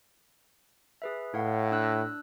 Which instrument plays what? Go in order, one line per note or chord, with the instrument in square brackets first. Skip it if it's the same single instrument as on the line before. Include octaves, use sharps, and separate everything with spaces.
[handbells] G#4 B4 E5
[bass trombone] A2 [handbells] C#5 F5 F#5
[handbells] D4 E6 F#6